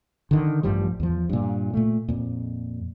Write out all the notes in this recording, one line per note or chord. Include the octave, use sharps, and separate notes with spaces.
D3 D#3
A1 G2 F3 G3
E2 F3
G2 A#2
A#2 A3
F2 A#2